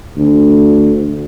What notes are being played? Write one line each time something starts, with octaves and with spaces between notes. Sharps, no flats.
D2